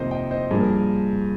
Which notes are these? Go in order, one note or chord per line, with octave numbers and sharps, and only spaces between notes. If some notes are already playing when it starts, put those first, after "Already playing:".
Already playing: F2 C3 D#3 A#3 A#4 C5 D#5
D#5 G5
C5 D#5
G2 F3 A#3 G#4
A#4
G#4